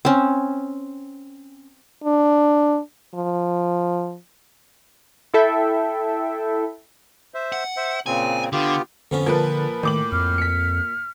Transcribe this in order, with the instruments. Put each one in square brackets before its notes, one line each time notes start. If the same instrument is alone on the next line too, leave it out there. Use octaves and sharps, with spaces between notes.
[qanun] C4 C#4
[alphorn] D4
F3
[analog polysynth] E4 A4 E5 G5
[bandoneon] C5 E5
[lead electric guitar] F#5
[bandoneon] C5 E5
[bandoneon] A#2 C#3 C4 [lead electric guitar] G#5
[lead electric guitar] D3 [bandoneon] B3 F4 G4
[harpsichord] F2 B3 C#4 [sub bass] D3
[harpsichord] A#2 [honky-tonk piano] F3 A4 B4
[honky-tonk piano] A2 D6 F#7 [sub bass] D#3
[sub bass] F2 [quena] F6
[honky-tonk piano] B6 C#7